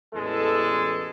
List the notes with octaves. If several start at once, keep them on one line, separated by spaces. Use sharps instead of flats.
A1 E2 G#3 A4